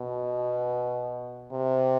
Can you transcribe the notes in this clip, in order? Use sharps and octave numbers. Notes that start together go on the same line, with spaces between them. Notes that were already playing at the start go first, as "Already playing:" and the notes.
Already playing: B2
C3